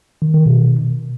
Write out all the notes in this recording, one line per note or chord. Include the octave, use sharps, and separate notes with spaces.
D#3
D#3
B2